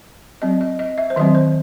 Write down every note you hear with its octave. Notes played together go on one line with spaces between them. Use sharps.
F#3 C4 D#5
D#5
D#5
E5
C5
D#3 F#3 C4 D#5
C5